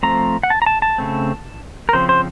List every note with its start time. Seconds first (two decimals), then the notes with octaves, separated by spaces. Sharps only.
0.03 F3 A3 C4 A#5
0.43 F#5
0.50 A5
0.62 A#5
0.66 A5
0.82 A5
0.98 C#3 A3 C4
1.89 A#4
1.93 C#3 F3 C4 C5
2.09 C5